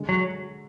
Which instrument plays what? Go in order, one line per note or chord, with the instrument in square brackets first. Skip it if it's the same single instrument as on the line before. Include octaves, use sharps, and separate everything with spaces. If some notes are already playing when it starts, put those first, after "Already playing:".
Already playing: [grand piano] D3 G#3
[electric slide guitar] F#3